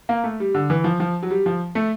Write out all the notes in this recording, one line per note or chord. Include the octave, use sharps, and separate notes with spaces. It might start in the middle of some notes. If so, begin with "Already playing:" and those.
A#3
A3
G3
D3
E3
F3
F3
F#3
G3
F3
A3